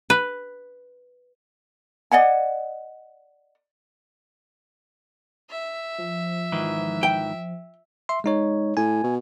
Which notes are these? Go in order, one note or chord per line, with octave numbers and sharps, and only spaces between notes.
B4
D5 D#5 F#5 G#5
E5
F3
G#2 D#3 E3
G5
E5 C6
G#3 D#4 C#5
A2 G#5
B2